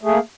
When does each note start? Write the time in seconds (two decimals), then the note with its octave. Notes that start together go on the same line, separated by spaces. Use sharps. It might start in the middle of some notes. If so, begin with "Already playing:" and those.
0.01 A3
0.05 G#4
0.08 A#3